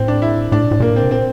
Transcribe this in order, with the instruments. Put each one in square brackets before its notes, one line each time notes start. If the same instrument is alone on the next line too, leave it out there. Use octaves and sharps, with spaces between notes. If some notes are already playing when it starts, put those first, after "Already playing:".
Already playing: [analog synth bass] A2 [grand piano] C4
[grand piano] D4
E4
[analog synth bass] A2 [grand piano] D4
[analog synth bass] A#2
A2
[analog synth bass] A#2 [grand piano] A#3
[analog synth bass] A2
[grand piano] C4
[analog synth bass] C3
[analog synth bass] A#2 [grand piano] C4